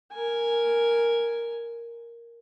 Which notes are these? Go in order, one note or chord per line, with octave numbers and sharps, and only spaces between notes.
A#4 G#5